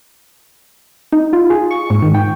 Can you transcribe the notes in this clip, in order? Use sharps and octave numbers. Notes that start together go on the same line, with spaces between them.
D#4
F4
G#4
C#6
G#2
D#3
G5